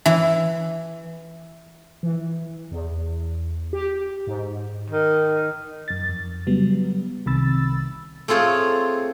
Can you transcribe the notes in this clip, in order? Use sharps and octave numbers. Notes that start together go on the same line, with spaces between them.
E3
E3
E2
G4
G#2
D#3
F#2 A6
F2
C#3 F#3 G3 B3
C2 C3 D#3 B5 E6 A6
A3 C4 F4 G#4 C#5